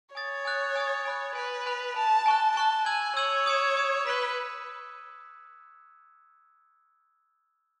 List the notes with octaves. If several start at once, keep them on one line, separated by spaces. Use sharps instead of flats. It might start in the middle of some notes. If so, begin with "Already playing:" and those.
C#5 G#5 D#6 A6
G#5 D#6 F#6 A6
G#5 D#6 F#6 A6
G#5 B5 F#6
B4 G#5 B5 F#6
G#5 B5 F#6
G#5 A5 B5 F#6
G#5 C#6 F#6
G#5 A5 C#6 F#6
G#5 E6 G#6 D#7 F#7
C#5 E6 G#6 D#7 F#7
D#6 G#6 C#7 E7
D#6 G#6 C#7 E7
B4 C#6 F#6 B6